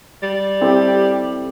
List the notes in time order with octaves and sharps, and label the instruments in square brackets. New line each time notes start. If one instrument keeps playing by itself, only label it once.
[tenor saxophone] G3
[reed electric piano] C4 E4 A4 [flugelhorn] G4